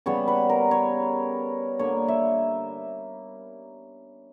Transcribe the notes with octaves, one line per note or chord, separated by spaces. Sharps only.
C#3 G3 B3 C#5
B4
A#4
C#5
D3 A#3 C#5
E5